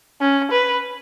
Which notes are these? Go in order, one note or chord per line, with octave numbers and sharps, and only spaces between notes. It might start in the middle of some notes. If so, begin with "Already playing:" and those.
C#4
B4